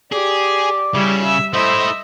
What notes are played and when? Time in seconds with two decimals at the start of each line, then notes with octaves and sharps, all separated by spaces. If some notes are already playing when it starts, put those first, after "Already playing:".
0.12 G4 G#4 D5
0.95 C#3 G3 E4
1.23 E5
1.54 A3 E4 C5 D#5 E5